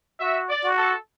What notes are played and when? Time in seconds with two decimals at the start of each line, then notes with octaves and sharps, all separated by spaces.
0.20 F#4 E5
0.49 D5
0.63 F#4
0.77 A4